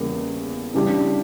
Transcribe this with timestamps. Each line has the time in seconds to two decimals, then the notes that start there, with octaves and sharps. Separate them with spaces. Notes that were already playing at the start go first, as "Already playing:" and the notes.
Already playing: E2 C#3 G3 A#3
0.74 C#3 E3 G3 D4